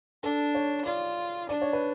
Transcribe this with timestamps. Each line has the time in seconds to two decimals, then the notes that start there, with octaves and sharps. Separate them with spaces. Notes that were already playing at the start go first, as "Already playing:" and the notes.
0.23 D4 A4
0.55 C#5
0.85 F4 D5
1.49 D4 D5
1.62 C#5
1.73 B4